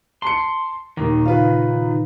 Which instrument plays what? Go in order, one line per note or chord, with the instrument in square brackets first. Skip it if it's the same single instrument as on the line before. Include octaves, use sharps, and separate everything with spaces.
[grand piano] A5 C#7 [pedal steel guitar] C6
[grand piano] D#2 [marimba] A#2 D#4 A#4 [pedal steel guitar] D#3
[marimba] C#3 D#4 F5 [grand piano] F4 B4